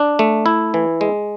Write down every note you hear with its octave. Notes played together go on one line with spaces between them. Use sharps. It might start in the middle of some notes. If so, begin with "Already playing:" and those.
Already playing: D4
A3
E4
E3
G#3